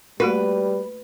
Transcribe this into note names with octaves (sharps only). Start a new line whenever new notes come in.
G3 A3 A#3 F#4 B4